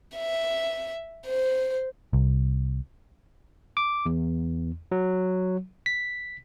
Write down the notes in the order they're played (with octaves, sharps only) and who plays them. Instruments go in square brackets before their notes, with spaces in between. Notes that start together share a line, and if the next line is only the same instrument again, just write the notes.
[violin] E5
C5
[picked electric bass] C2
[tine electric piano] D6
E2
F#3
B6